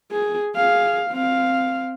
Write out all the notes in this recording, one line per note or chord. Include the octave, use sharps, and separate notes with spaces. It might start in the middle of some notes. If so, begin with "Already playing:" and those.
G#4
G#4 F5
C4 F5